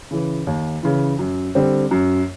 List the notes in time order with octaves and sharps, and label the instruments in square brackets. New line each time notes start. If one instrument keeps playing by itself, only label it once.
[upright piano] C#3 E3
D#2
C#3 E3
F#2
D3 G3 C4
F#2